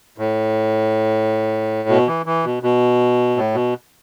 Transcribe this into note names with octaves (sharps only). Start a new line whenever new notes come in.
A2
B2
E3
E3
B2
B2
A2
B2